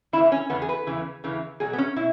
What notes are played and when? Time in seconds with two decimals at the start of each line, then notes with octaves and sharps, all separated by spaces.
0.13 E2 C#3 E3 E4
0.32 C#4
0.50 E2 C#3 B3
0.62 G#4
0.69 B4
0.87 E2 C#3 E3
1.24 E2 C#3 E3
1.60 B2 F#3 G#4
1.73 B3
1.78 C#4
1.96 B2 E4